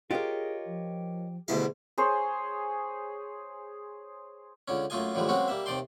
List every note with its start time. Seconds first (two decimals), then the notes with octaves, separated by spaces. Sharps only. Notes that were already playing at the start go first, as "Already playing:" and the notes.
0.11 F4 G4 G#4 A#4 C#5 D#5
0.66 F3
1.48 D2 B2 G3 E4 G#4 D#5 F5
1.98 G#4 C5 C#5
4.68 C#2 D3 C#4
4.90 F#2 A3 A#3 F4 D#5 G#5
5.15 A2 D3 E3 F3 G3 G#3
5.29 F#3 G#3 A#3 C4 C#4 F#4
5.48 G3 A#3 E5
5.66 D#2 C3 D#3 D5 G5 C6